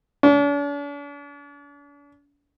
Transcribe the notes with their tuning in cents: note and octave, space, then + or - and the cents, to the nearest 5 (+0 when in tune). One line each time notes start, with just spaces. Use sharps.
D4 -45